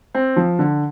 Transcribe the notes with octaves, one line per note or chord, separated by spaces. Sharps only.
C4
F3
D3